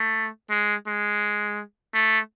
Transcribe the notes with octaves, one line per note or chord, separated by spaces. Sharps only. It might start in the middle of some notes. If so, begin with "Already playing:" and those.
Already playing: A3
G#3
G#3
A3